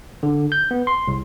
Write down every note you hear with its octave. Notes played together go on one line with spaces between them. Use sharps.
D3
G6
B3
C6
C2